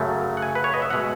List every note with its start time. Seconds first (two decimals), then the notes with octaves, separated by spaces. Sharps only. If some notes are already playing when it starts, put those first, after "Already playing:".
Already playing: F#2 C#3 F#3 A3
0.37 F#5
0.42 G#5
0.55 B4
0.64 C#5
0.73 D#5
0.82 E5
0.90 B2 G#3 F#5